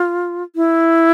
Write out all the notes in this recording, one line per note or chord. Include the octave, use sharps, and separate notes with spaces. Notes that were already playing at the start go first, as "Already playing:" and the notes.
Already playing: F4
E4